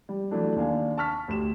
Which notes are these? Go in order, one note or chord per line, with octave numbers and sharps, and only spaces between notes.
G3
E3 F#3 A3 D4
D#2 D4 F5 G#5
A5 C#6 F6 B6
D2 G4 E7